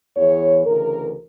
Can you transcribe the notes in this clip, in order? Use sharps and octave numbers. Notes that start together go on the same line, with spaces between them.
E2 E3 C#5
D2 C#3 E3 A#4